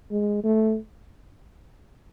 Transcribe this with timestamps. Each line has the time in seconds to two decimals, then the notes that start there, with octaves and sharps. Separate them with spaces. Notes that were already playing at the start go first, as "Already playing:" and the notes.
0.11 G#3
0.44 A3